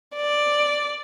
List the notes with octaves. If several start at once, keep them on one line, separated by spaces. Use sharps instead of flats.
D5